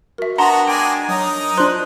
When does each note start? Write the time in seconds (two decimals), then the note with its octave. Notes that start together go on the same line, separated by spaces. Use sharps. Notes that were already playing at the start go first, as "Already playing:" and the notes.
0.18 F#4 A#4 E5
0.38 B3 D4 F#4 F#5 A5 A#5 C6
0.68 G#3 D5 G5 G#5
1.08 F#3 D#4 A#4 D#6
1.57 D4 F4 C5 C6 F#6